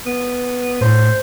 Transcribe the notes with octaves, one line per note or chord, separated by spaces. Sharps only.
B3
A2 C5